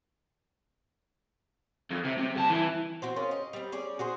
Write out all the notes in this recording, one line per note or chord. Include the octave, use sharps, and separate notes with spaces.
F2
C3
C3
G2 A5
E3
C4 F#4 C5
C#4 F4 G#4 A#4
D#5
G3 C4
C#4 G#4 D5
F#4 G#4 C5